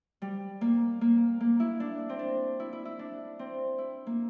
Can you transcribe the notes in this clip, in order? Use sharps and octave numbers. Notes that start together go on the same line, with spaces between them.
G3
A#3
A#3
A#3
E4
D4
C4
D4
E4
E4
E4
D4
C4
E4
A#3